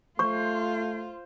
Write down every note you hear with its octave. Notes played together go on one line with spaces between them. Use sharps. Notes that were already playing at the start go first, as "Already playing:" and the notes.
A3 F4 C5 C#6